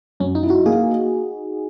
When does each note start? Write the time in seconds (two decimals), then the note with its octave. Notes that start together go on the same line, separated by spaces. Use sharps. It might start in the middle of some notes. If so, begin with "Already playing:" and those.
0.20 F#2 C#4
0.35 D#4
0.43 E4
0.50 F#4
0.65 A#3 G#4